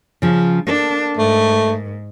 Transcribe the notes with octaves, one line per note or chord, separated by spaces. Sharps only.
C#3 F3
A#3 D4 A4
G#2 A3